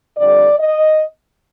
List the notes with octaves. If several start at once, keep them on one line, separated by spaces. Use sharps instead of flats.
F2 D3 G3 D5
D#5